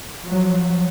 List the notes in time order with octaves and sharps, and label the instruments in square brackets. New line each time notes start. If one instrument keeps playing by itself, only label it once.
[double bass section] F3 F#3